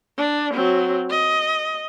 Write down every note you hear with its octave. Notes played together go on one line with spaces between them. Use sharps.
D4
F#3 C4
D#5